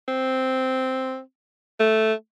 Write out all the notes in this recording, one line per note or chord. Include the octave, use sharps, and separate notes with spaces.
C4
A3